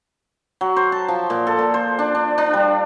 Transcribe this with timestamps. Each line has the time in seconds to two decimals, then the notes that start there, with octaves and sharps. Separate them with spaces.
0.61 F#3
0.76 C5
0.92 A5
1.08 F3
1.30 A#2
1.47 A4
1.59 A#2
1.74 C5
1.99 D4
2.15 D4
2.38 D4
2.54 G3